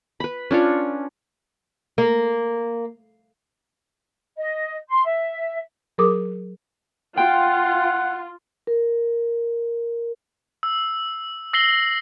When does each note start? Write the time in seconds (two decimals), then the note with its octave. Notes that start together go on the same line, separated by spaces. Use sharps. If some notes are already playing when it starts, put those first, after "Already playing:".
0.20 B4 B5
0.51 C#4 D4 F4 C#5
1.98 A#3
4.36 D#5
4.89 C6
5.04 E5
5.98 F#3 G#4 A#4 D6 D#6
7.18 F4 F#5 G5
8.67 A#4
10.63 E6
11.53 E6 A#6 C7 F#7 G7